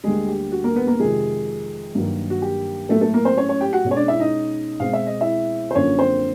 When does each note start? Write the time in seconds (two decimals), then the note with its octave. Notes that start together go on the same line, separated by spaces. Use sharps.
0.04 D2 D3 G3 G#3 A#3 G#4
0.28 G4
0.52 F#4
0.64 A#3 A#4
0.76 B3 B4
0.87 A#3 A#4
0.99 F2 C3 D#3 G#3 G#4
1.95 G2 D#3 F#3 A#3
2.30 F#4
2.42 G4
2.89 A2 F#3 A3 A#3 A4
3.01 A3 A4
3.14 A#3 A#4
3.25 C4 C5
3.38 C#4 C#5
3.49 C#4 C#5
3.61 G4 G5
3.73 F#4 F#5
3.85 B2 G#3 C#4
3.91 C#5
3.96 D4 D5
4.08 E4 E5
4.20 D#4 D#5
4.80 B2 G#3 C4 F5
4.93 E5
5.07 D#5
5.21 E4 E5
5.71 C5
5.75 F#2 D3 F3 A#3 C#4 C#5
5.99 C4 C5